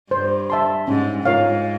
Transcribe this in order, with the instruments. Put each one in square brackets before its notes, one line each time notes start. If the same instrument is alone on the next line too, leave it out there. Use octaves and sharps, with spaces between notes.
[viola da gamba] G2 [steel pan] C5
[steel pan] E5 A5 C6
[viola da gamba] G#2 [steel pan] C#4
[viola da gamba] G#2 [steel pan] F4 A#4 C#5 F5